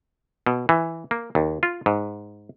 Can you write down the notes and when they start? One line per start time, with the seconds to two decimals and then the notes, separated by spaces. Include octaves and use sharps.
0.46 B2
0.69 E3
1.11 A#3
1.35 D#2
1.63 F4
1.86 G#2